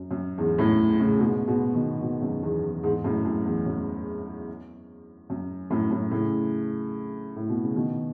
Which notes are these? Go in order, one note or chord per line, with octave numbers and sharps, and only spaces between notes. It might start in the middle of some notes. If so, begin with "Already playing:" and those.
Already playing: F#2
F#2
E2 G#2
F#2 A2
A2 C#3
G#2 B2
G#2 B2
B2 D#3
B2 D#3
F#2
E2
E2
E2 G#2
F#2 A2
F#2
E2
F#2
F#2
F#2 A2
F#2 A2
A2 C#3
A2
B2
C#3
B2 D#3